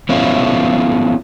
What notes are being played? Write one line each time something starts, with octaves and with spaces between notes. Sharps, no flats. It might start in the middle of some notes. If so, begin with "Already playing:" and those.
B3 C#4 E4 F4